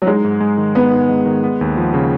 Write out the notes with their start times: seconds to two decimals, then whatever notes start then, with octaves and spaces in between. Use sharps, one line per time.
0.02 F#3
0.07 G#3 D#4
0.24 G#2
0.41 G#3
0.58 D#3
0.75 B3 D#4
0.92 G#2
1.09 G#3
1.26 D#3
1.44 B3
1.61 D#2
1.77 F3
1.94 C#3